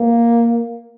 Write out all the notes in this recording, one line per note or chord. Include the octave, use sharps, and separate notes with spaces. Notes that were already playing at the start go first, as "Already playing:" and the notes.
Already playing: A#3